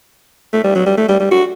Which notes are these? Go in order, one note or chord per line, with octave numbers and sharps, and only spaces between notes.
A3
G3
F#3
G3
A3
G3
G3
F#4